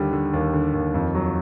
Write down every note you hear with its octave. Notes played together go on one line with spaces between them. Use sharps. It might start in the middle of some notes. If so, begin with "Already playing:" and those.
Already playing: D#2 D3 G3
D3
D#2
D3
D#2
F2
F#3